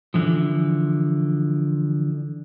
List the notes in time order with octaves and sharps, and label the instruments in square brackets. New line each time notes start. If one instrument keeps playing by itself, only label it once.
[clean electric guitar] D3 E3 F3